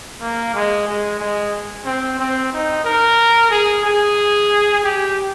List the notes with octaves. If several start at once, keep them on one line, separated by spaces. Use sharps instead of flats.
A#3
G#3
G#3
G#3
C4
C4
D#4
A#4
G#4
G#4
G4